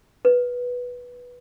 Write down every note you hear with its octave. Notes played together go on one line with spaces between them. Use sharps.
B4